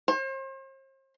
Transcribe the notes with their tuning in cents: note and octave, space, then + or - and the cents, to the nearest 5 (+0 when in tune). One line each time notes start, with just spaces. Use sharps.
C5 +40